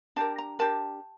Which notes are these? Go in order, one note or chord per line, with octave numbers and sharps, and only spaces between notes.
D4 G4 A#4 A5
A#5
D4 G4 A#4 A5